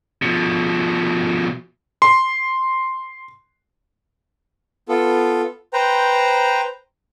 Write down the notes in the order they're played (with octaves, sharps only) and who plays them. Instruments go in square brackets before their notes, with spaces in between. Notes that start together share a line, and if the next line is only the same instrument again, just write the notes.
[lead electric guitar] B2 F3
[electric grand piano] C6
[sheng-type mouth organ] B3 F4 A4
B4 C5 G5 A#5